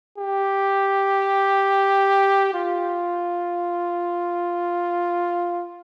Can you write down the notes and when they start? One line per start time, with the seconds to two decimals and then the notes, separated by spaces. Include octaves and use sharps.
0.18 G4
2.54 F4